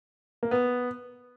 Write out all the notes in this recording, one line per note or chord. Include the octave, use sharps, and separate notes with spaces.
A#3
B3